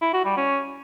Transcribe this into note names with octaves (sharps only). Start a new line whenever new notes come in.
E4
F#4
G3
C#4